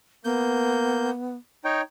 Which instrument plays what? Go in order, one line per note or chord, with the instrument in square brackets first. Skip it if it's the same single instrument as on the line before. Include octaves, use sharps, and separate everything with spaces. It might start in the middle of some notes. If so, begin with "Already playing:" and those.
[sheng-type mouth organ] A#3 G6 [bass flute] B3
[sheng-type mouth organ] D#4 C#5 G5